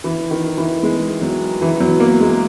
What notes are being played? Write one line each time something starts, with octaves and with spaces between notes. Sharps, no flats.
E3
D#3
E3
G#3
F#3
E3
F#3
A#3
G#3